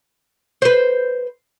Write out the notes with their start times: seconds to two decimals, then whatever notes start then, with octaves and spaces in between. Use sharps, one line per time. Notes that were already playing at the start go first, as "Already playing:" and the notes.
0.62 B4 C5